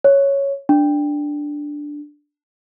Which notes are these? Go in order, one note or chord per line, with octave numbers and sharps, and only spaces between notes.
C#5
D4